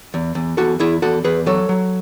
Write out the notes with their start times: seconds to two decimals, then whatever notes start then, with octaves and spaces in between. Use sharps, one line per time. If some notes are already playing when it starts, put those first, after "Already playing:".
0.14 E2
0.35 E2
0.57 E2 F#4 A4
0.80 E2 E4 G#4
1.02 E2 F#4 A4
1.24 E2 G#4 B4
1.46 F#3 A4 C#5
1.69 F#3